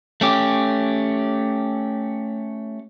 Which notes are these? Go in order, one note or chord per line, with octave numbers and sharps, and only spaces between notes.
A3 C#4 G4